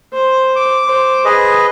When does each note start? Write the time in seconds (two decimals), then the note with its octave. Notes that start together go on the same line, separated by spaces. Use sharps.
0.13 C5
0.56 D6
0.86 C5
1.25 G#4 B4 D#5